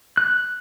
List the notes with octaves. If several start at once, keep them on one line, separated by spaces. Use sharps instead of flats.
F#6